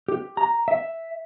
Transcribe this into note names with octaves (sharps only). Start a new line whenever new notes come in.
G4
A#5
E5